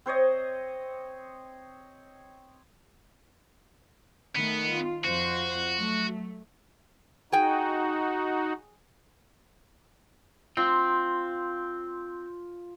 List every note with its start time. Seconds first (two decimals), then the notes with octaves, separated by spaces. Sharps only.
0.06 C4 C5 C#5 D#5
4.36 D#3 A3 B3
4.72 F4
5.04 F2 F4 F#4 C5
5.76 F#3 A3
7.32 D#4 F#4 G#4 G5
10.57 C4 F4